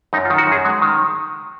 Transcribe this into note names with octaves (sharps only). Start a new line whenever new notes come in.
F#2 D#4
F4
D#3
F#4
F#2 G#4
G#3 F#4
D#3